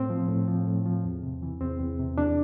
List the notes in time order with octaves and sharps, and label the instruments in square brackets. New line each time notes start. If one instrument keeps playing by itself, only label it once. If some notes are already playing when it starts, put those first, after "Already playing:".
Already playing: [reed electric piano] A2 C4
F3
A2
F3
A2
F3
E2
C3
E3
E2 C4
E2
C3
E2 D4